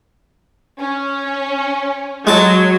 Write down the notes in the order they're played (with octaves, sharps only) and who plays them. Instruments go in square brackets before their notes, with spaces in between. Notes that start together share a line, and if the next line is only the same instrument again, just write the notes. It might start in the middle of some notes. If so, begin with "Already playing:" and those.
[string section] C#4
[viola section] F#3 [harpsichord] G#3 A5